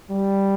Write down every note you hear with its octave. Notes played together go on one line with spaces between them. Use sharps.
G3